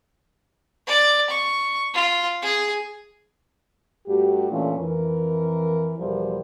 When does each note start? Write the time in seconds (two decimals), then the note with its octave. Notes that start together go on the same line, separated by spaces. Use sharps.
0.87 D5
1.29 C#6
1.94 F4
2.42 G#4
4.07 G2 A3 F#4 G4
4.50 A#2 E3 A3 C#4 D4 F4
4.78 F2 E3 A#4
5.98 E2 B2 F3 G3 A#4 C5